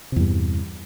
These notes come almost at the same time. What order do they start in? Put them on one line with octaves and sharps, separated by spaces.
C3 E2 G2